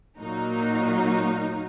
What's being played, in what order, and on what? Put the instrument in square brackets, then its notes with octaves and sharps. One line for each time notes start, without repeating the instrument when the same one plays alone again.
[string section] A#2 F#3 A#3 D#4